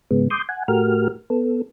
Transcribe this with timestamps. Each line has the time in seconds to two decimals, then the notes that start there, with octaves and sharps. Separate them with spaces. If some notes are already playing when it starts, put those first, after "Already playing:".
0.11 G#2 C#3 G#3 B3
0.30 C6 D6 D#6 G6
0.49 F#5 G#5
0.68 A2 A3 F#4 G4 A#4 F6
1.30 B3 A4